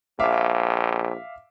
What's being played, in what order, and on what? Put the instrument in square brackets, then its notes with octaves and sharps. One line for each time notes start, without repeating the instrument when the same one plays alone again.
[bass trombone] A#1 [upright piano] E5 F5 D6